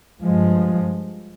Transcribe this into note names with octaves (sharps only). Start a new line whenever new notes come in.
G2 F3 G#3